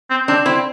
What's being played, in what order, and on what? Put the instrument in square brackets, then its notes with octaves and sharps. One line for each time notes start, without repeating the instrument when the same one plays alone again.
[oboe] C4
[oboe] C4 [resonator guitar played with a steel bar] D4
[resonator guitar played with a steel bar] C4 [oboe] E4